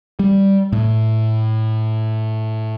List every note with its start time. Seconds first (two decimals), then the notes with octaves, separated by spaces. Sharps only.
0.19 G3
0.73 A2